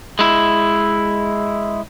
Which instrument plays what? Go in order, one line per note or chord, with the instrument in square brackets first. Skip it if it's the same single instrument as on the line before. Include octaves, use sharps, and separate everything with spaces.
[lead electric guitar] G#3 E4